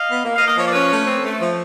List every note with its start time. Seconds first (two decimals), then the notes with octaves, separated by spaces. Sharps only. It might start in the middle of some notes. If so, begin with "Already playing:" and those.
Already playing: D#5 F5
0.08 B3
0.25 A#3
0.36 D#5 F5
0.42 A#3
0.47 D#5 F5
0.58 F3 C#5
0.66 D5
0.72 C#4 B4 C#5
0.91 A3
1.07 C4
1.24 A3
1.40 F3